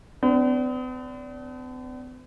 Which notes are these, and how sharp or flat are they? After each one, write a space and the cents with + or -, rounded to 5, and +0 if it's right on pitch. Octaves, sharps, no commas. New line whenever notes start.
B3 +45 D4 -20